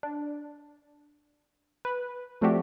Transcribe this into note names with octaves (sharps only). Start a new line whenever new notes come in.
D4
B4
F3 A3 C4 D4 F#4 G4